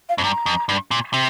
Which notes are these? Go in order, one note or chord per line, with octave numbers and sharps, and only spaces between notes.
F5
F2
G2 A#5
F2
G2
A#2
C3